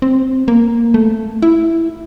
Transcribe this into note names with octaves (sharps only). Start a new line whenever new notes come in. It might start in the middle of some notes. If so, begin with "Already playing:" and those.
C4
A#3
A3
E4